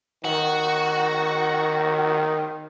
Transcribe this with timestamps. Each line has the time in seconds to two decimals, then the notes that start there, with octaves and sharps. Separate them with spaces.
0.24 D#3 F#4